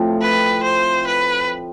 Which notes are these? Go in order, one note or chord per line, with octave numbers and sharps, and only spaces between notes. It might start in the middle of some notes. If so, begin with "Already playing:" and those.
Already playing: A2 F3 C4 F4
B4
C5
B4